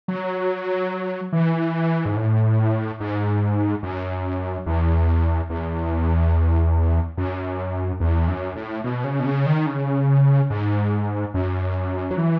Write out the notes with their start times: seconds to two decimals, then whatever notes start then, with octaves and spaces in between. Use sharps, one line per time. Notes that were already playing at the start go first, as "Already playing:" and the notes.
0.08 F#3
1.32 E3
2.06 G#2
2.16 A2
3.00 G#2
3.83 F#2
4.66 E2
5.50 E2
7.17 F#2
8.00 E2
8.28 F#2
8.56 A2
8.84 B2
9.04 C#3
9.20 B2
9.25 C#3
9.46 D#3
9.66 C#3
10.50 G#2
11.34 F#2
12.11 F#3
12.17 E3